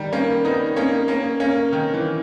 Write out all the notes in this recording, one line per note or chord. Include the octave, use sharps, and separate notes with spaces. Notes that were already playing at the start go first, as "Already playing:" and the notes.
Already playing: D#3 G3
A#3 C#4
B3 D#4
A#3 C#4
A#3 C#4
A#3 C#4
D#3
E3